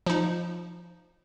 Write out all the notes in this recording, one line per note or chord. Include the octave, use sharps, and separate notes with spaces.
F3 D#4